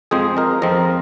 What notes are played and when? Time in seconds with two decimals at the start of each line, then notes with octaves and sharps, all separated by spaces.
0.11 F2 F3 G#3 C4 G#4 C5
0.37 A#4 D#5
0.62 F2 F3 C4 A#4 D#5